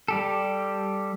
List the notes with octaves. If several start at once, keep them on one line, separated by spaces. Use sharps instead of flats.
G3 G4 A4